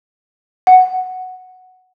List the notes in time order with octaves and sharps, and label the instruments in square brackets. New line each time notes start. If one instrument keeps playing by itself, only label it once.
[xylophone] F#5